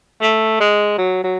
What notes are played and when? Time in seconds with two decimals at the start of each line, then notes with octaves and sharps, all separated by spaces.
0.22 A3
0.60 G#3
0.98 F#3
1.23 F#3